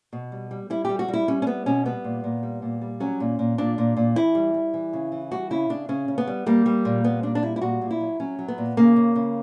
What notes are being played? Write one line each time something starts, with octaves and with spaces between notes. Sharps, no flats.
B2
G3
G3
G3 E4
G3 G4
F#4
G3
E4
G3 C#4
C#4
G3 B3
B2 C#4
G3 B3
A#2
A#2
G3
A#2
G3
F#3 C#4
A#2
A#2
A#2 D4
A#2
A#2
E3 E4
G3
G3
E3
C#3
E3
G3 F#4
C#3 E4
C#3 D4
C#3 C#4
C#3
B3
G3
G3 A#3
G3
A#2
G3 B3
A#2 D4
D4
G3 E4
E4
A#2 F#4
A#2
E4
F#3
F#3 C#4
F#3
B3
A#2
C#3 A#3
C#3
C#3